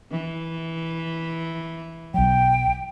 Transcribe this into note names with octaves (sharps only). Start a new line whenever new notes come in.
E3
B1 F#3 G5